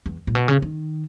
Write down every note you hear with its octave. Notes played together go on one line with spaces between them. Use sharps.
E2
A#2
B2
C#3
D#3